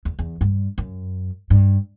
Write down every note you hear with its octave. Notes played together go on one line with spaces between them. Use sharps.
E2
E2
G2
F#2
G2